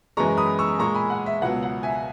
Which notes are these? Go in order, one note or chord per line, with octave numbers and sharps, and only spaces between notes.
F#2 E3 G#3 A#5 C#6
B5 D#6
C#6 E6
A#2 G#3 A#5 C#6
G#5 B5
F#5
E5
C#2 B2 F#3 F#5
F#5
E5 G#5